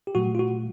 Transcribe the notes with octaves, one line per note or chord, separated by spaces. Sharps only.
G4
A#2 F#3 A3 F#4
F4
F#4